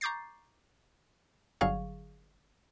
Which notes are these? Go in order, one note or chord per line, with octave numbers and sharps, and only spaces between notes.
A#5 C#6 D6 G6 A6 C7
G1 D3 F#3 G#4 F5 C#6